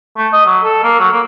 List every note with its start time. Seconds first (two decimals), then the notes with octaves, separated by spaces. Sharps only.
0.17 A3
0.33 D#5
0.46 F#3
0.64 A4
0.84 A#3
0.99 F#3
1.12 A#3